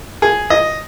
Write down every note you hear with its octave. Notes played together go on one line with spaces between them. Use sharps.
G#4
D#5